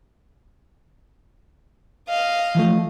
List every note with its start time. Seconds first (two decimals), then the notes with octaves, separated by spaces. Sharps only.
2.09 D#5 F5
2.55 E3 F3 A3